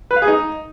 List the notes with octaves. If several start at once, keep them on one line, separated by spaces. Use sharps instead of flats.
B4
F5
G#4
D#4